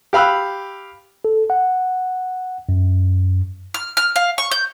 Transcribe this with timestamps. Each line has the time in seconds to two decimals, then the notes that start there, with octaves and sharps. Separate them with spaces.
0.13 G4 F5 B5 E6 F#6
1.25 A4
1.50 F#5
2.69 F#2
3.74 F6
3.97 F6
4.16 F5
4.38 C#6
4.51 G6